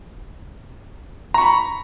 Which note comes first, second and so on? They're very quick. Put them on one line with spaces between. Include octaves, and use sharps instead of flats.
A#5 C#6 B5